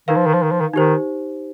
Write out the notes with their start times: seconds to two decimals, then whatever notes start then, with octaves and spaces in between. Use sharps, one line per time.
0.08 D#3 D#4 B4 F5
0.16 F3
0.26 D#3
0.34 F3
0.42 D#3
0.51 F3
0.60 D#3
0.74 D#3 D#4 G4 C5